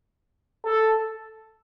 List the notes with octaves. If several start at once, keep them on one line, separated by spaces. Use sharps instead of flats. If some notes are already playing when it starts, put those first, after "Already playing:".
A4